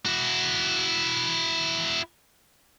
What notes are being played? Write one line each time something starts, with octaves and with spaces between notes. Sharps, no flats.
E4 F#4